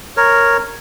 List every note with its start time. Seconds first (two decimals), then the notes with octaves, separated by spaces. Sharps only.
0.17 A#4 C#5